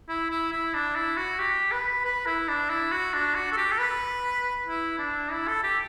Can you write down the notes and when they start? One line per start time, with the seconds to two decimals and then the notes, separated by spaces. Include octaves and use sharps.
0.09 E4
0.31 E4
0.52 E4
0.74 D4
0.96 E4
1.17 F#4
1.39 G4
1.72 B4
2.05 B4
2.27 E4
2.48 D4
2.70 E4
2.92 F#4
3.14 D4
3.35 F#4
3.52 A4
3.57 G4
3.72 A4
3.79 B4
4.66 E4
4.98 D4
5.31 E4
5.48 A4
5.63 G4